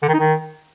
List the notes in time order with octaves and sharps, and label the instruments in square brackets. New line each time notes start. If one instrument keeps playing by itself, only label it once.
[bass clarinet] D3
D#3
D#4
D#3